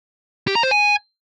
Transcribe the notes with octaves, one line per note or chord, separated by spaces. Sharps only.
G4
A#5
C5
G#5